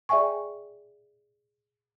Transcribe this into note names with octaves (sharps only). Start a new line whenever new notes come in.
G#4 D5 E5 G5 G#5 C#6